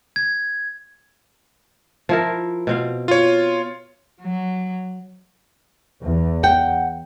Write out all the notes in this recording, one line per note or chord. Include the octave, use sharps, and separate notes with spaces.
G#6
F3 E4 A#4
B2 C4 F5
F4 C#5
F#3
E2
F#5 G5